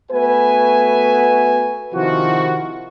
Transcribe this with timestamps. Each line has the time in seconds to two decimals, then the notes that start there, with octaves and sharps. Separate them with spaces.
0.12 A3 B3 F#4 B4 E5 G#5
1.95 C3 D#3 F3 E4 F#4